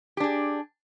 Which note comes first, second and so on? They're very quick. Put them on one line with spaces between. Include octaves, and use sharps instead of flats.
G4 D4 G#4